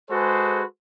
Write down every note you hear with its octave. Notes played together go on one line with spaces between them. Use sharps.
G#3 F#4 G#4 A4 B4 C5